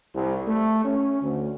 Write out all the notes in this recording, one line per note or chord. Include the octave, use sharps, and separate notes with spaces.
C2
A3
C#4
D2